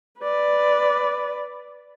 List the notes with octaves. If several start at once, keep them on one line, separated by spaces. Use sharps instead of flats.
B4 D5